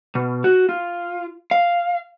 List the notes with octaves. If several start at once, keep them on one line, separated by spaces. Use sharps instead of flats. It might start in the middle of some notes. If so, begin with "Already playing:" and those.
B2
F#4
F4
F5